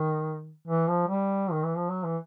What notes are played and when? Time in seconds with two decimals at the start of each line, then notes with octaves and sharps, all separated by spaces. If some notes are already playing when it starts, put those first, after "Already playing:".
Already playing: D#3
0.68 E3
0.88 F3
1.08 G3
1.52 D#3
1.64 E3
1.76 F3
1.89 F#3
2.04 E3